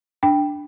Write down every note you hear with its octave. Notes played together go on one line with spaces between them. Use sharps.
D4 G5